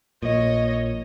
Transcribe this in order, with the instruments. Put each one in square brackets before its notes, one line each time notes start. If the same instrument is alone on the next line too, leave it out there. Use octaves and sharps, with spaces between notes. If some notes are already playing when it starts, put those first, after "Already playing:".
[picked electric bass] A#1 A#2 [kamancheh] C#5 D#5